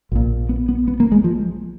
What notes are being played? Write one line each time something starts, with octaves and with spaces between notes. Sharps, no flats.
A#1 A#2
B3
B3
B3
A#3
G#3
F3